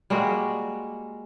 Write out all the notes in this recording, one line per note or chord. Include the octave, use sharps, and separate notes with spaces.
G3 G#3 A#3 F#4